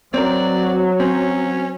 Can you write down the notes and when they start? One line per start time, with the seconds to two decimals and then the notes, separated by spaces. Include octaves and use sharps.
0.14 F#3 C4 A#4 D5
1.00 C4 C#4